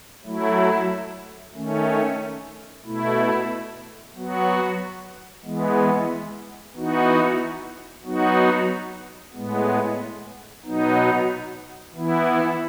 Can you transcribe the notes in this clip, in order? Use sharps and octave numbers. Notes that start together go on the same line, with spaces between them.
F#3 A3 E4
D#3 A3 C#4
B2 A3 E4
F#3 B3 F#4
E3 G#3 B3
E3 B3 D#4 F#4
F#3 B3 D#4 F#4
A2 G#3 B3
B2 F#3 B3 D#4
E3 B3 E4